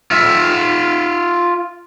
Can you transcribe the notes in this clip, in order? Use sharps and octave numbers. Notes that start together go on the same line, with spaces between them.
F4 E5